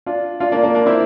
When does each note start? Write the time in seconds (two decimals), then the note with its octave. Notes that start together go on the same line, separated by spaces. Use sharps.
0.06 D4 F4
0.40 D4 F4
0.52 A#3 D4
0.63 A#3 D4
0.75 A#3 D4
0.86 C4 E4